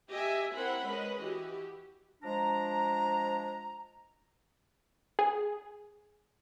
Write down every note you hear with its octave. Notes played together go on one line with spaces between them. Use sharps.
G4 D#5 E5 G#5
C4 E4 A#4 C5 F#5 B5
G#3 C#4 B4 D#5
E3 F#4 G4
F3 G#3 D4 A#5
G#4